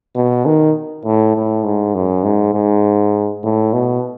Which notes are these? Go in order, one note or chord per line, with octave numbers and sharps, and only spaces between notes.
B2
D#3
A2
A2
G#2
F#2
G#2
G#2
A2
B2